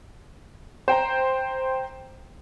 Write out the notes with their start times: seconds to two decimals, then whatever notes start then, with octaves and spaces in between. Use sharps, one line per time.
0.88 C5 G5 A#5